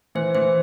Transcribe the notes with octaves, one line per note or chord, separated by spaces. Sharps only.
E3 C5
E3 C5